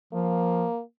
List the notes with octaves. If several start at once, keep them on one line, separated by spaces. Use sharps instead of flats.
F3 A#3